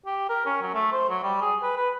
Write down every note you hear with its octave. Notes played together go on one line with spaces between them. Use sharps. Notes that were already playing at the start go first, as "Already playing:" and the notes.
G4
A#4
C#4
F#3
A3
C5
F#3
G3
G#4
B4
B4